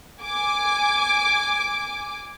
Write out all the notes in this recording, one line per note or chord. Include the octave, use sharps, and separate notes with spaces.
G#5 D6